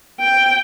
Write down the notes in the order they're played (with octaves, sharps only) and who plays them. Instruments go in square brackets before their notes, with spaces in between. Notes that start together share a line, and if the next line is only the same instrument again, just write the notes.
[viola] G5